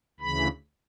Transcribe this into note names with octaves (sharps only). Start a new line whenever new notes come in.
D2 C#3 E3 B5